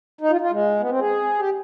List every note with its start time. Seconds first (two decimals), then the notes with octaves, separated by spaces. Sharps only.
0.21 D#4
0.31 F4
0.41 F4
0.51 G#3
0.80 B3
0.89 C4
0.99 G#4
1.39 G4